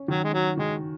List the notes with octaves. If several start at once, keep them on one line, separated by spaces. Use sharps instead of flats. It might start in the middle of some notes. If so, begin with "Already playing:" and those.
Already playing: C#4
D#3 F#3
G#3
F#3 F#4
D#3 G#3